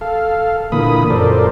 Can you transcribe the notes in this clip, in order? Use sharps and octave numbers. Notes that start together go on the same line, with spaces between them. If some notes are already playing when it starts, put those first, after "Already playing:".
A4 F5
A#2 D3 E3 A#3 B5 D#6
F#2 A#2 A4 A#4 C5 D5